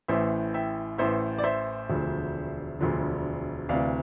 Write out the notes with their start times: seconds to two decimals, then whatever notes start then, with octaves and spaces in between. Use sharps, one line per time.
0.08 A1 A2 E3 C5 E5
0.54 E5 G5
0.98 A1 A2 E3 C5 E5
1.38 D5
1.44 C5 E5
1.89 E1 D2 D3 F3
2.79 E1 D2 D3 F3
3.69 D2 C3 E3 D5 F5